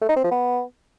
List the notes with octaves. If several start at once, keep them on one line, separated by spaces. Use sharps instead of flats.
A3
D#4
C4
F3
B3